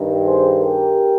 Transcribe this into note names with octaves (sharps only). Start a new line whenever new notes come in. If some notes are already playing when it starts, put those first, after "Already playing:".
Already playing: G2 D#3
G#4 C5
G4 A#4